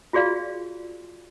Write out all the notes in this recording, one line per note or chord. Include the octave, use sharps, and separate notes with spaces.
F4 F#4 G#4 D5 F5